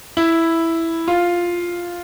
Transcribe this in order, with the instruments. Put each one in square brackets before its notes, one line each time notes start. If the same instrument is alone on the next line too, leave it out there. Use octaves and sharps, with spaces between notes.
[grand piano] E4
F4